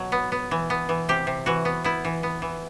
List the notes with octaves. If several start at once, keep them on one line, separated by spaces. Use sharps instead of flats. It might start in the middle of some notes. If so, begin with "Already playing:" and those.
Already playing: B2 F#3
B3
B3
E3
B3
E3
C3 G4
C3
E3 F#4
B3
B3 E4
E3
B3
E3